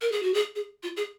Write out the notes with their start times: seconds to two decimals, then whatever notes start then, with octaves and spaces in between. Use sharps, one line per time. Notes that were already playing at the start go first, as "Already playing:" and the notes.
0.01 A#4
0.12 G#4
0.23 F#4
0.34 G#4
0.56 G#4
0.83 F4
0.97 G#4